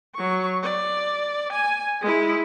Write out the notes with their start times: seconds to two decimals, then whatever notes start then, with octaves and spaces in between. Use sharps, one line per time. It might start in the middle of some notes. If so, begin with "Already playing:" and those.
0.15 F#3 C#6
0.63 D5
1.53 G#5
2.02 G#3 E4